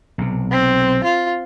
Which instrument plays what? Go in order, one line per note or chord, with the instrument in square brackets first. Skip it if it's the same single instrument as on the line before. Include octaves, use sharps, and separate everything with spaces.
[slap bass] B1 C3
[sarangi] C4
F4